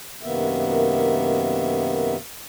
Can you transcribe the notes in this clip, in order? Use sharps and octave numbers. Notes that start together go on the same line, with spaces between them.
F#2 C3 D#3 A#3 B3 E5